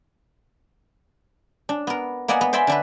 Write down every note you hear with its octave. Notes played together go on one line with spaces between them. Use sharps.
D4
B3 A#4
A#3 B3 D5 D#5 F#5 G#5
B3
C5 D5 E5 G#5 B5 C6
D3 D4 B4